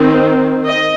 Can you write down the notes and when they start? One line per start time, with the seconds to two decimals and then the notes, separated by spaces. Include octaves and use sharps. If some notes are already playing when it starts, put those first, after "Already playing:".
Already playing: D#3 C4
0.66 D#5